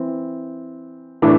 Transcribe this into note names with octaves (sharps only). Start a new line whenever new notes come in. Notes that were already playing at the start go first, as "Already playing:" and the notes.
Already playing: E3 C4
A2 E3 A3 D4